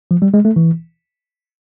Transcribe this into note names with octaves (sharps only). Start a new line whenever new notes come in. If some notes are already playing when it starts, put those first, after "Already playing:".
F3
G3
G#3
A3
E3